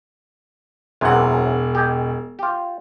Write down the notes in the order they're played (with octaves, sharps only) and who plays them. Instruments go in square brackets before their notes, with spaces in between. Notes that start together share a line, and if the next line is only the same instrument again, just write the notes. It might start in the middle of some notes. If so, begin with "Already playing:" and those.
[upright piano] E1 F#5 [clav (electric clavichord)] F#2 C3 E3
[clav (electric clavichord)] G4 D#5 G#5
F4 G4